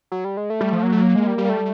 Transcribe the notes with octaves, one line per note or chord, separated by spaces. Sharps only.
F#3
G3
G#3
A3
G3
F3
F#3 A#3
A3
A#3
G#3
G3
G3
A#3
A3